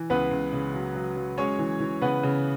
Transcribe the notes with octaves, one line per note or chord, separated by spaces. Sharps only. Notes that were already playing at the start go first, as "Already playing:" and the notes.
Already playing: E3
C#2 B3 B4
C#2
C#3
F#3
F#3
F#3
G#3 C#4 C#5
E3
E3
C#3 B3 B4
C#3